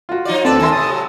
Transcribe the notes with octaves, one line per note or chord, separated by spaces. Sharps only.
F4 F#4
F3 D#4 D5
D2 C4 A4 B4 D5 A5
D#3 A#3 G#5 C6 E6
A2 C3 A5 D#6
F#3